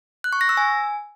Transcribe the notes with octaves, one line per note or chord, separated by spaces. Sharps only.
F#6
C#6
A#6
E6
G#5